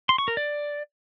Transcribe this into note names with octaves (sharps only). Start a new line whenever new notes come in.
C6
C#6
A#4
D5